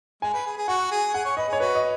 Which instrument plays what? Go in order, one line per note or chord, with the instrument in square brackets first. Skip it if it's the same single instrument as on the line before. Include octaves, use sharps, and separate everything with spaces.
[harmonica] G#3 [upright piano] G#5
[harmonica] B4
G#4
G#4
[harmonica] F#4 [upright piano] F#5
[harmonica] G#4
[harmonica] G#4 [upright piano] F#5
[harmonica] C#5
[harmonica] B4 [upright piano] D#5
[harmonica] G#4 [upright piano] C#5
[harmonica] F#4 [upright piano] B4
[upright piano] D#5